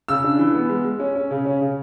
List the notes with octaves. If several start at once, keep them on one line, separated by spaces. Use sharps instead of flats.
C#3 E6
D4
E3
B3
G#3
G#3
C#4
C#4
C#3
C#4
C#3